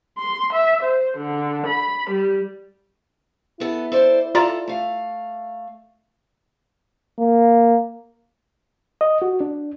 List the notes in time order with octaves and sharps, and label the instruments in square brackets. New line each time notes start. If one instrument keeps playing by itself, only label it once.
[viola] C6
E5
C5
D3
B5
G3
[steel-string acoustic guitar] B3 A4 [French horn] E4
[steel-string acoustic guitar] A4 C5 D5
[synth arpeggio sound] F4 D5 A#5 [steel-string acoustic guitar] A4
[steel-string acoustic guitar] A3 F5
[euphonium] A#3
[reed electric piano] D#5
F#4
D4